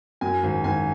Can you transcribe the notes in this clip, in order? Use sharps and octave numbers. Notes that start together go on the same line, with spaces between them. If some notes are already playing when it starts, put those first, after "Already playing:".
F#2 G#5
G#1
G#1 G#5